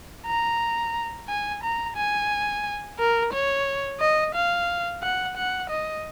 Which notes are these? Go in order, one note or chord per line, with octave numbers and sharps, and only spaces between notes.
A#5
G#5
A#5
G#5
A#4
C#5
D#5
F5
F#5
F#5
D#5